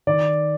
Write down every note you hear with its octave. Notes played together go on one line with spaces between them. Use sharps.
D#3 D5